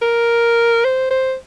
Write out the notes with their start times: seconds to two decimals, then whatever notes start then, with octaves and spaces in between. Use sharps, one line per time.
0.02 A#4
0.84 C5
1.11 C5